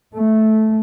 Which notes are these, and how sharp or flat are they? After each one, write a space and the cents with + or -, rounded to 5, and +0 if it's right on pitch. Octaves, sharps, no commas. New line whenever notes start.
A3 -10